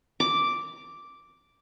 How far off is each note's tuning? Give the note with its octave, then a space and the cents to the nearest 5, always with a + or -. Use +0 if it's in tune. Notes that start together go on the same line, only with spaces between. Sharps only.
D6 -5